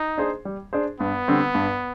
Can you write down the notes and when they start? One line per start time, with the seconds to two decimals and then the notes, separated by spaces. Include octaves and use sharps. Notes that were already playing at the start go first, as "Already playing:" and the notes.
Already playing: D#4
0.18 D4 G#4 C5
0.45 G3
0.73 D4 G#4 C5
1.00 G2 B3
1.28 D3 G3 C4
1.55 G2